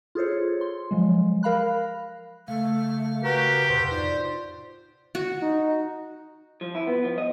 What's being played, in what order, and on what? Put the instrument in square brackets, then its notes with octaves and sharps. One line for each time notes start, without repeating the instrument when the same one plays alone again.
[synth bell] F4 G#4 A4 C5 C#5
C6
F3 F#3 G#3
A#4 F5 B5 F#6
[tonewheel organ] C#3 F5 [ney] A3
[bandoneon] F#4 A#4 [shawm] G4 [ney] B4
[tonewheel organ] F2 A2 C3 [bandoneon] C5 G6
[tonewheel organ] D#4 F4 [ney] D5
[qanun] F#4
[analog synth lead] D#4
[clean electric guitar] F3
E4
B3
F3
D#5